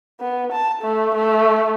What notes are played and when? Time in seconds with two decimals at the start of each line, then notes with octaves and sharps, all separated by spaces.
0.20 B3
0.52 A5
0.82 A3
1.15 A3